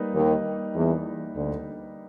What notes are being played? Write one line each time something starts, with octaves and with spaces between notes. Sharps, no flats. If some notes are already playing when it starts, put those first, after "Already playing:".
Already playing: G3 A#3 D#4 B4
D#2 D#3
E2 E3
D2 D3